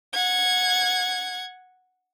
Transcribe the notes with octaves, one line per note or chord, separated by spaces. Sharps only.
F#5 G#6